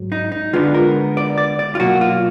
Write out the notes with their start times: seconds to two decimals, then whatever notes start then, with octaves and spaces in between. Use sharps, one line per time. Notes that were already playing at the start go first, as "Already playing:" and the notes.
Already playing: G#2 F#3
0.12 D#4
0.32 D#4
0.53 D3 G#3 B3 D4 F4
0.74 A#4
1.17 D5
1.38 D5
1.59 D5
1.75 F4
1.79 B2 F#3 A#3 F#4
2.01 F4